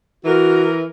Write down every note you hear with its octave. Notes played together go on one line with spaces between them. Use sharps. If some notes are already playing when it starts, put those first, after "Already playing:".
E3 F#4 A#4